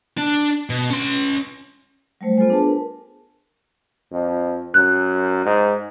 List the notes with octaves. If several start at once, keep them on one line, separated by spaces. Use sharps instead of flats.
D4
B2
C#4 C6
F#3 G3 A3 C5
B3 F4 A4 C5 G#5
D4 G#4 B4 A5
A#4
F2
F#2 F#6
G#2